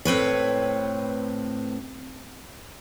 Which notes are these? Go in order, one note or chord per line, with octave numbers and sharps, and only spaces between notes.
A2 C4 B4 C#5